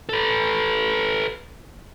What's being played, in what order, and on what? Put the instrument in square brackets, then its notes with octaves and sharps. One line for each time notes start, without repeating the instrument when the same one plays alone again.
[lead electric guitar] A4 B4